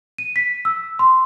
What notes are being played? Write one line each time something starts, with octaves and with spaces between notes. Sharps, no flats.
D#7
B6
E6
C6